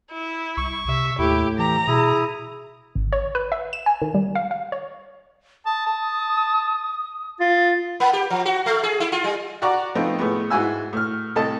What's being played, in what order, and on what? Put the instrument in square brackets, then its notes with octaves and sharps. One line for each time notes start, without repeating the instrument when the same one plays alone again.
[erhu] E4
[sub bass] C2 [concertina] C#6
[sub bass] C3 [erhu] E5
[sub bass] D#2 [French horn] A2 [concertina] E4 [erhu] G4
[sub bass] E3 [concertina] G4 [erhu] A#5
[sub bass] B2 [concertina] E4 D#6 [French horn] G#4
[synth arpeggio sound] G#1
C#5
B4
E5
E7
G#5
D#3
G3
F5
F5
C#5
[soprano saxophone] A5 [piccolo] D#6
[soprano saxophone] A5
[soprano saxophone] F4 [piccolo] A6
[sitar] A#3
G4
F3
F#4
A3
G#4
E4
F4
G3
[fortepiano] F#4 D5 F#5 A#5 C#6 D6
F3 A3 B3 C4 D#4
A2 G#3 B3
G#2 E4 F#4 G#5 E6
A2 F6
C2 A2 A4 D#5 A5